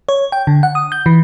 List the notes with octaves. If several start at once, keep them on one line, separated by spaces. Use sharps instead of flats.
C#5
G5
D3
F#5
D#6
G6
E3